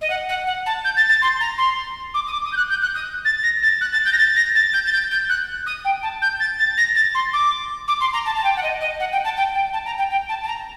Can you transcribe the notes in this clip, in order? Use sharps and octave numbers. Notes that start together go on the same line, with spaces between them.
D#5
F#5
F#5
F#5
A5
G6
A6
A6
C6
A#5
C6
D6
D#6
D6
D#6
G6
F#6
G6
F#6
D#6
A6
A#6
A6
F#6
A6
G6
A#6
A6
A#6
A6
G6
A6
G6
G6
F#6
D#6
G5
A5
G6
A6
A6
A#6
A6
C6
D6
D6
C6
A#5
A5
A5
G5
F#5
D#5
D#5
F#5
G5
A5
G5
G5
A5
A#5
G5
G5
A5
A5
A#5